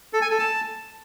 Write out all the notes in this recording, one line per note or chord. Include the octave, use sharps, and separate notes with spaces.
A4
G#5
A4
A5